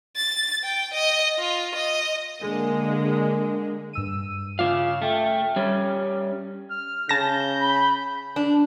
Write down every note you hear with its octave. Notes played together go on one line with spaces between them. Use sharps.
A6
G5
D#5
F4
D#5
D3 G#3 A#3
G2 E6 D#7
C#3 G#3 F4 F5 D6 E7
A3 E5 G5 F6
G3 C#4
F6
C#3 A5 G6 A#6
B5
D4